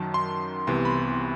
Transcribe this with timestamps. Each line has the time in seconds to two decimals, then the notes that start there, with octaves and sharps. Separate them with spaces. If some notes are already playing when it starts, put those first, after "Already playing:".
Already playing: F#2 D#3 F#3 A5
0.14 C6
0.67 C2 C3 E3 B3 C6
0.85 B5